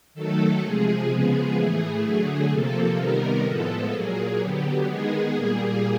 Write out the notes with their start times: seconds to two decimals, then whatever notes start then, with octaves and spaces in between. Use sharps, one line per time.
0.14 D#3 F#3 A3 A4
0.61 C3 F3 G#3 G#4
1.09 C#3 F3 G#3 B3 G#4
1.55 A2 E3 A3 G#4
2.03 D3 F#3 A3
2.50 C3 F3 A#3 A4
2.97 C3 D#3 G3 B3 A#4
3.44 A2 F3 G#3 B3 A4
3.91 A#2 F#3 A#3 G#4
4.38 D3 F#3 B3 G4
4.85 D#3 G#3 B3 G#4
5.32 A#2 G3 A#3